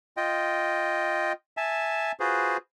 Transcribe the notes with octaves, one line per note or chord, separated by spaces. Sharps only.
F4 D#5 G5
E5 G#5 A5
F4 F#4 G#4 B4 C5